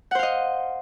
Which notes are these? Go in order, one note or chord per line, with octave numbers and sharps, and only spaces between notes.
C5 D#5 F5 F#5